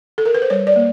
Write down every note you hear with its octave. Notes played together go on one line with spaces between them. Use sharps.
A4
A#4
B4
C5
G3 C#5
D5
A#3